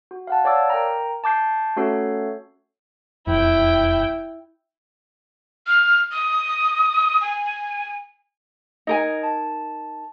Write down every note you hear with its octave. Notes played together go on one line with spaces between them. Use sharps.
F#4
F5 F#5 A5
C#5 D5 F5 D6 E6
A#4 G5 A#5
A5 D6 G6 C7
A3 C#4 F#4 A4 C#5 C7
E1 F2 E4 G5
F6
D#6
G#5
D#4 A#4 D#5 G#5
A5